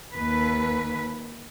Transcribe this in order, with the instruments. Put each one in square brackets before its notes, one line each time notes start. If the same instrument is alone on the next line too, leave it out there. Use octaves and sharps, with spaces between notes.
[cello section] D#2 B4